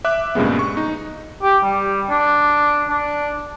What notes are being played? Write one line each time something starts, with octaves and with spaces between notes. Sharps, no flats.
E5 D6 F#6
G2 A#2 C#3 G#3 B3
C#6
D#4
G4
G3
D4
D4